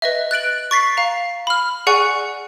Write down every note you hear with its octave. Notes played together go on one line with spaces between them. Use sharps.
B4 D#5 E5
F#6 A6 D7 F#7
C#6 A6 B6 C7
F5 A#5
B5 F6
G#4 D5 F#5 G#5 C#6 F#6